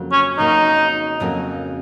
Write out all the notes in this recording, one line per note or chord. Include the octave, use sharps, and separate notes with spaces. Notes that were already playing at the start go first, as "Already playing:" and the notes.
Already playing: F2 C#3 F#3 A#3
C#4
F2 C#3 F#3 A#3 D#4
F2 C#3 F#3 A#3